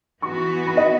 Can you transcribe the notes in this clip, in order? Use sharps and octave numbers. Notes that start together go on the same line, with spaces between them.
E3 B3 F#4 C#6
B5
D#5